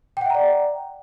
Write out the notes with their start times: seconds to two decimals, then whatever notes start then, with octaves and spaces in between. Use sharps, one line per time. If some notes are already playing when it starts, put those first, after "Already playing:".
0.17 G5
0.21 F#5
0.26 E5
0.30 A#5
0.35 D5